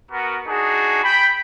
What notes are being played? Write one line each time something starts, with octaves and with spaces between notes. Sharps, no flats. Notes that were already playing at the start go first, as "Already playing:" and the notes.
B3 F#4 A#4
D4 D#4 F#4 G#4
G5 B5